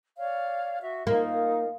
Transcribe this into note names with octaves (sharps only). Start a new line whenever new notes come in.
C#5 D5 F5
F#4 E5
A#3 D#4 F4